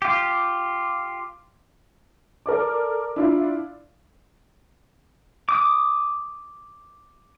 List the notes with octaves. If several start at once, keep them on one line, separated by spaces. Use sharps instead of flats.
F4 G4
A4 A#4 D5 D6
D4 E4 F4
D6 D#6